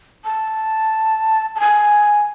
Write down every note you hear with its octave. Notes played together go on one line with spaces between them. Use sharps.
A5
A5
G#5